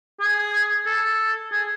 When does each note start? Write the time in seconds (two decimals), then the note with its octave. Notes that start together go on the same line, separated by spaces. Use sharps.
0.21 G#4
0.86 A4
1.52 G#4